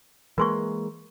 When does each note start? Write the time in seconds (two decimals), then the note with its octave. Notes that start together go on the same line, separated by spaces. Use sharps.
0.38 E3 G#3 A#3 A#4 C6 C#6